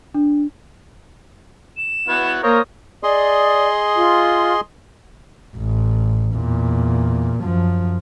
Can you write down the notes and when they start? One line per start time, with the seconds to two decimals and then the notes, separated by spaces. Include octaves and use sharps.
0.14 D4
1.77 E7
2.08 B3 E4 F#4
2.43 A#3 A#4 C5 C#5 D#6
3.03 G#4 D5 D#5 C6
3.96 F4
5.56 A1
6.36 E2 A#2
7.40 F#2 F3